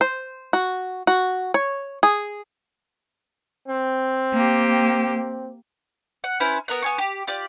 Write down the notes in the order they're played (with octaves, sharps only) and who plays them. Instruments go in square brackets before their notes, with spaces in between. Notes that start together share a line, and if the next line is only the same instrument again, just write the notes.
[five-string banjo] C5
F#4
F#4
C#5
G#4
[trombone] C4
[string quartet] A#3 G4
[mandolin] F#5
C#4 E4 B4 C5
B3 A#4 F#5
B3 G#5 C#6
G4
F4 G4 D5